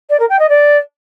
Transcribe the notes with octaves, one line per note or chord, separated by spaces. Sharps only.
D5
A#4
G5
D#5
D5